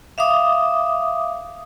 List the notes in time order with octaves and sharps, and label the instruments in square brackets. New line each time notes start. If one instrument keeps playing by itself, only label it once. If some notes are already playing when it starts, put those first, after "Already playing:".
[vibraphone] E5 F5 D6 D#6